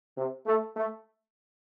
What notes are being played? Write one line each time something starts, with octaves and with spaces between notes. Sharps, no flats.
C3
A3
A3